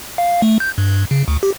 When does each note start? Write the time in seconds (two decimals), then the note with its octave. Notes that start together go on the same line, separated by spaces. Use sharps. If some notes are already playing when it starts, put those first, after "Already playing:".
0.18 F5
0.42 A3
0.60 G6
0.78 G2
1.11 C#3
1.28 D2
1.43 G4